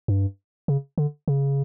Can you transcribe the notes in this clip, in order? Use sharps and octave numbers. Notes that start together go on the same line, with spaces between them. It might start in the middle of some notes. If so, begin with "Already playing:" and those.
G2
C#3
D3
C#3